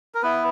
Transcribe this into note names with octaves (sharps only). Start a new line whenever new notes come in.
A#4
B3 E4 B4